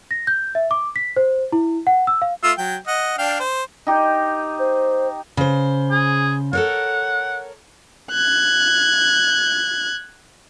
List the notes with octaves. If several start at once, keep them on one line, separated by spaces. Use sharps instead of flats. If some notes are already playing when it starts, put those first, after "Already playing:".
A#6
G6
E5
D6
B6
C5
E4
F#5
E6
F5
A3 F4 E6
F#3 G5
D#5 F#5
D4 F5 G5
C5
D#4 G4
C5
C#3 C5
G#4
A4 A#4 C#5 F#5
F#6 G#6